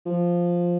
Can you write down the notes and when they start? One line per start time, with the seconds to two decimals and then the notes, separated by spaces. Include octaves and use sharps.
0.06 F3